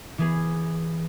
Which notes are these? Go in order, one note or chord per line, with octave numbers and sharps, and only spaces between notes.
E3 B3 G#4